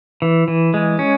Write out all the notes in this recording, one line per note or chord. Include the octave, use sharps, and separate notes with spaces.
E3
E3
G#3
C#4